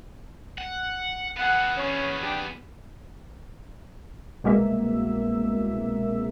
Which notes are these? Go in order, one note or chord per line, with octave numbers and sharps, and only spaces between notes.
F#5
B3 G#4 F#5
C#4
D4 G4
C2 B2 G#3 A#3 E5